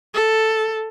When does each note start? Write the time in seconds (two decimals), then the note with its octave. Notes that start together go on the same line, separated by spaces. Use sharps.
0.15 A4